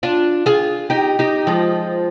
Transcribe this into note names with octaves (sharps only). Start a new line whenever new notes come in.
D4 F4
F4 G#4
D#4 G4
D#4 G4
F3 G#3